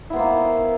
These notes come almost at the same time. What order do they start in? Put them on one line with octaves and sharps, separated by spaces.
E4 B3 C5 A#3